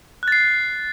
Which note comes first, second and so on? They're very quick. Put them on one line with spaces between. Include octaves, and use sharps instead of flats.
F#6 A6 C7